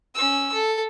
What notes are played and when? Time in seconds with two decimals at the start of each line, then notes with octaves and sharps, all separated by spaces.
0.15 C#4 E6
0.53 A4